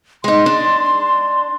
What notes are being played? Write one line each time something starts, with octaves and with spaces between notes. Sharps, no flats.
G#3 D#4 C6
D4